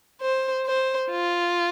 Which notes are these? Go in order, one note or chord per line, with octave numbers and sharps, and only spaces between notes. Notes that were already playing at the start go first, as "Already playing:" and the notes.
C5
C5
F4